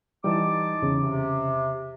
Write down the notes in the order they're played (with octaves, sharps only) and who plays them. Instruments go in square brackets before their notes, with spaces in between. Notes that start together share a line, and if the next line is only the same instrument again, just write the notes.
[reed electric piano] E3 G3 [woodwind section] D#4 A5 D6
[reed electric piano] E2 C#3
[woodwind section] C3